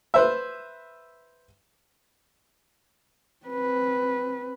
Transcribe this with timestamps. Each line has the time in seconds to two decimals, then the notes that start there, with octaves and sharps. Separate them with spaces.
0.14 B4 C5 E5
3.46 C4 B4